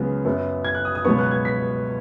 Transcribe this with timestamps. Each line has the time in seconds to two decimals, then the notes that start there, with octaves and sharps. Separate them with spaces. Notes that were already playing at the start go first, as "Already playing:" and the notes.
Already playing: C#2 C#3 F#3 B3
0.25 F#2 F#3 B3
0.65 G#6
0.75 F#6
0.85 D#6
0.95 D#6
1.05 C#2 B2 F#3 B3 C#6
1.19 F#6
1.31 G#6
1.45 B6